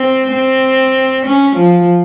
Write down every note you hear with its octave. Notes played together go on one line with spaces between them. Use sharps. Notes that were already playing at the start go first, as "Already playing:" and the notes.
Already playing: C4
C4
C#4
F3